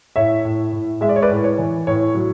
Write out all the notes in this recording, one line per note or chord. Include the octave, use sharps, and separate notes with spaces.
A2 C#5 E5
A2
A2
G#3 E5
D5
C#5
B4 D5
A2
C#5
E3
A2 C#5
F#3